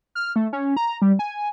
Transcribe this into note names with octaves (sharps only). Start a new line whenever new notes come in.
F6
A3
C#4
A#5
G3
G#5